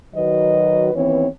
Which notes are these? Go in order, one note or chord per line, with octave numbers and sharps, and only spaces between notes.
D#3 F#3 F#4 B4 D#5
D#2 E3 B3 C4 C#5